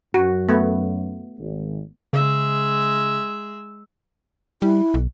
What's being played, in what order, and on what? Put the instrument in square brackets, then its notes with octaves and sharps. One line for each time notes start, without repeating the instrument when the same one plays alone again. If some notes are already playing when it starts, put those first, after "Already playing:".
[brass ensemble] F#2 [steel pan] F#4
[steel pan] A3 B3
[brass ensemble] G#1
[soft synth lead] C#3 [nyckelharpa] G#3 E5
[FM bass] G3 [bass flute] E4
[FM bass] B1